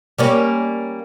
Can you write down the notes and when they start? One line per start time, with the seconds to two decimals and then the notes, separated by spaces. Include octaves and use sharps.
0.18 G3 A#3 C#4